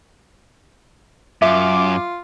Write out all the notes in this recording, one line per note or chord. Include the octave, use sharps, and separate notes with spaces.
F#2 F4 E5 D6